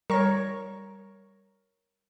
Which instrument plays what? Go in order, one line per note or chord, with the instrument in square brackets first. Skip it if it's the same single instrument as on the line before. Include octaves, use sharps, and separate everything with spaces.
[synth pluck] G3 C#6 A#6 [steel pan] A#4 C#5